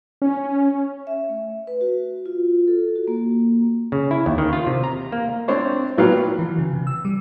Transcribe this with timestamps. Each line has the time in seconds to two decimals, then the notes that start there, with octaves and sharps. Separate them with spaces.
0.22 C#4
1.07 E5
1.29 A3
1.67 B4
1.81 F#4
2.26 F4
2.68 A4
2.96 F#4
3.08 A#3
3.92 C#3
4.11 E4
4.26 D#2
4.38 D#3
4.53 F4
4.67 C3
4.84 A#5
5.12 A#3
5.48 C4 D4 C5 C#5
5.98 A#1 F#3 B3 F5 G5
6.39 E3
6.58 C#3
6.73 C3
6.87 E6
7.05 G3